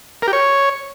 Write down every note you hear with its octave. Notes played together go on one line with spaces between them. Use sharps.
A#4
G4
C#5